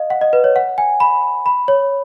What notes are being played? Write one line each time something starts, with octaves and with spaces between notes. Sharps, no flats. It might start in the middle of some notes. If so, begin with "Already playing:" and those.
Already playing: D#5 F5
F#5
D#5
B4
C#5
F#5
G#5
B5
B5
C#5